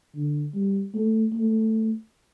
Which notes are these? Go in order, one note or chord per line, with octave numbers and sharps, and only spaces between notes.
D3
G3
A3
A3